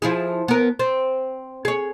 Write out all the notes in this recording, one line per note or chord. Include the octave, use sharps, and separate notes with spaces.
F3 E4 G#4
B3 A#4
C4
G#4 C#5